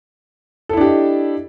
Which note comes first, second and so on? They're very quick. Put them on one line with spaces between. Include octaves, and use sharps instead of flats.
A4 E4 D4 G4 D#5